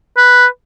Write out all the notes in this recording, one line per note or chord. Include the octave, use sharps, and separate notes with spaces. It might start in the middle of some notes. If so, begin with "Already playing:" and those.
B4